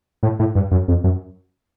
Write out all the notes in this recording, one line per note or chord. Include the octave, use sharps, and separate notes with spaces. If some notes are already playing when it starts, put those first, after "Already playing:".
A2
A2
G2
F#2
F2
F#2